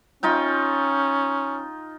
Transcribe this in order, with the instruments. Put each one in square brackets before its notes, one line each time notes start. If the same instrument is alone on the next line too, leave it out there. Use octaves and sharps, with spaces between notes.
[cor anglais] C#4 [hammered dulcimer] D#4 F4 G5